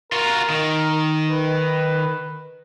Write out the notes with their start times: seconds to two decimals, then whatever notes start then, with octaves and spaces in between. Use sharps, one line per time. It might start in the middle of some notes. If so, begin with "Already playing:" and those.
0.12 F4 F#4 A#4
0.50 D#3
1.31 B4